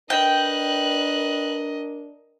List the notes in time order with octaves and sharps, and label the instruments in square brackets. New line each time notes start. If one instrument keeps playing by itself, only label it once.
[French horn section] D4 A#4 [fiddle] B4 F#6 [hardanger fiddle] D#5 [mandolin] G5